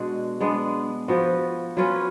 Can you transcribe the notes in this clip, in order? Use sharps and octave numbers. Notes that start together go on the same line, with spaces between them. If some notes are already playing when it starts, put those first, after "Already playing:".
Already playing: B2 G#3 D4 F#4
G#3 B3 D4
F3 B3 F#4
F#3 C#4 F4 B4